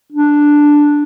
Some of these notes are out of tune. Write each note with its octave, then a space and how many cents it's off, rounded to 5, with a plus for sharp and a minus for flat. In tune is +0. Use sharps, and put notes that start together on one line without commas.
D4 +0